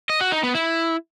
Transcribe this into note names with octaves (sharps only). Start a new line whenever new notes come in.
D#5
F#4
D#4
B3
E4